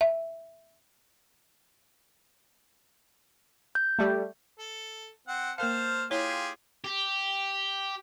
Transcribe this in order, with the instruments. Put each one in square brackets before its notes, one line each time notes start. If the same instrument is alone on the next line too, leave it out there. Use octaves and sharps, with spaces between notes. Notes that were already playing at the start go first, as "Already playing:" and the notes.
[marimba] E5
[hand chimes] G6
[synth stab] G3 A3
[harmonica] A4
C4 F#5
[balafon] A#3 A#4 F5 [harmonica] C5 A5 F6
[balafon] E4 C#5 [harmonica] F4 G4 G#4
[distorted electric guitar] G4